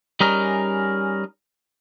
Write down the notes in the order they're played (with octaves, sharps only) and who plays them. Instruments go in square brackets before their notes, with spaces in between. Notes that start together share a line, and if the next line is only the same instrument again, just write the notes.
[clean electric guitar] G3 C#4 D#4 G#4 A#4